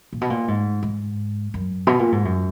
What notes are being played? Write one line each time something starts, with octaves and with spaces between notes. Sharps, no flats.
A#2
B2
A#2
G#2
G#2
F#2
B2
A#2
G#2
F#2